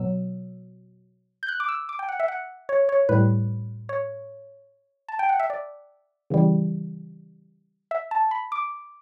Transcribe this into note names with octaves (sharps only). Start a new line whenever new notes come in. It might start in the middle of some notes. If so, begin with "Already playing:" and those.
Already playing: B2 F#3 E6
G6
F#6
D6
E6
D6
G5
F#5
E5
F#5
C#5
C#5
A2 G3 B4
C#5
A5
G5
F#5
E5
D5
C#3 E3 G3
E5
A5
B5
D6